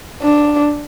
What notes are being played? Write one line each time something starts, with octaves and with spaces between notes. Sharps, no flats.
D4